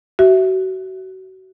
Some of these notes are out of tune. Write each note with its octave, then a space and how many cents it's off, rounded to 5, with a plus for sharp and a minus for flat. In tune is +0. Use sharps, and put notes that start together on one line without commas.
F#4 +30 E5 +0